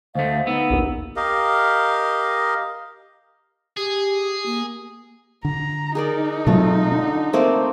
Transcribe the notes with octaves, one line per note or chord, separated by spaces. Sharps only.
D2 A3 C5 D#5 F5
B3 D#4 E6
A#1 D#2
G4 A#4 D#5 F5
G4 G#4
A#3
D3 A#5
D#4 G#4 A#4 D5
B2 F#3 G#3 A3 C4 F4
D3 D4
A3 A#3 C4 C5